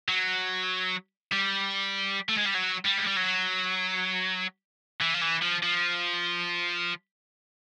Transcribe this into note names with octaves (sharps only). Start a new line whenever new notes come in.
F#3
G3
A3
G#3
G3
F#3
G3
G#3
G3
F#3
E3
F3
E3
F3
F3